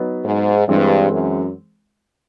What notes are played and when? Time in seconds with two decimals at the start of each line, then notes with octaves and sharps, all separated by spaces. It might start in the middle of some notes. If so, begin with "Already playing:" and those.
Already playing: F#3 B3 D#4
0.25 G#2
0.68 G2 E3 G#3 C4
1.11 F#2